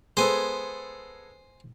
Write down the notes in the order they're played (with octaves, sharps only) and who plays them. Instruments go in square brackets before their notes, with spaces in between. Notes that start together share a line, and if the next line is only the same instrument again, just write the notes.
[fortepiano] G#3 B3 A4 [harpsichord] C5 G#5